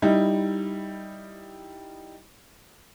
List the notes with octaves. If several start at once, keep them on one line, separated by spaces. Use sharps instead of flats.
G3 D#4 E4